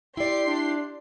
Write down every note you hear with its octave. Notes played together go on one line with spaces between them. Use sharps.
E4 G4 D5 C6 C7
D4